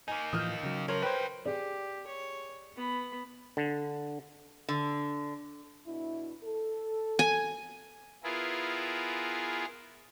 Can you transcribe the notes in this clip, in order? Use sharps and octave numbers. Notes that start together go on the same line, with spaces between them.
A#3 D#4 G#5
A2 E3 F3 D#6 F6 G6
C#3 F#3
F3 A#4 C#5
D4 G4 B4 C5
G4 G#4 D5
C#5
B3 B5
D3
D3
B2 D4 E4
A4
G#5
B3 E4 F4 G#4 A#4